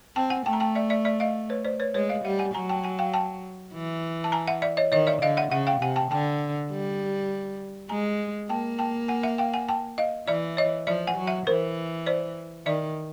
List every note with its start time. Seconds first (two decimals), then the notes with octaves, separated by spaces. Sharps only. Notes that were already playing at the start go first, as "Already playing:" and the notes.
0.16 C4 G5 A5
0.30 F#5 G#5
0.46 A3 G5 A5
0.53 A#5
0.60 G5 A5
0.75 D5 E5
0.90 D5 E5
1.05 D5 E5
1.20 D#5 F5
1.50 B4 C#5
1.65 C5 D5
1.80 B4 C#5
1.94 G#3 B4 C#5
2.09 D#5 F5
2.24 G3 E5 F#5
2.39 F#5 G#5
2.55 F#3 G#5 A#5
2.69 G5 A5
2.84 F#5 G#5
2.99 F5 G5
3.14 G5 A5
3.74 E3
4.24 A5
4.32 G#5 A#5
4.47 E5 F#5
4.62 D5 E5
4.77 C#5 D#5
4.92 D#3 C#5 D#5
5.07 D5 E5
5.22 D3 D#5 F5
5.37 E5 F#5
5.51 C#3 E5 F#5
5.67 F5 G5
5.81 C3 F#5 G#5
5.96 G5 A5
6.11 D3 G5 A5
6.71 G3
7.89 G#3 G#5 A#5
8.49 A#3 G5 A5
8.79 G5 A5
9.08 F#5 G#5
9.23 E5 F#5
9.38 F5 G5
9.54 F#5 G#5
9.69 G5 A5
9.98 D#5 F5
10.28 E3 D5 E5
10.57 C#5 D#5
10.87 F3 D5 E5
11.07 F#5 G#5
11.17 F#3
11.27 E5 F#5
11.47 E3 A#4 C5
12.06 C5 D5
12.66 D#3 D5 E5